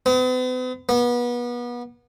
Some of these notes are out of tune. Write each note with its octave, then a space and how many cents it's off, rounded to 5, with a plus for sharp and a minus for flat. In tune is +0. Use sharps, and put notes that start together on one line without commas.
B3 +45
B3 -30